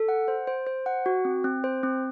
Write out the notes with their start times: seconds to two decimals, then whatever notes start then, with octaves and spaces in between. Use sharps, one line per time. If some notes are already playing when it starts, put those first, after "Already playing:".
Already playing: A4
0.08 F#5
0.28 C5
0.47 C5
0.67 C5
0.86 F#5
1.06 F#4
1.25 C4
1.44 C4
1.64 C5
1.83 C4